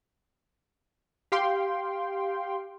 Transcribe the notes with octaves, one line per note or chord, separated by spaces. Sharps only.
G4 F5 G5 C6